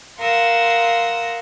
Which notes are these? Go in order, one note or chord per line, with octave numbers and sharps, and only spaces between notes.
A#4 F5 F#5 C6 D#6 E6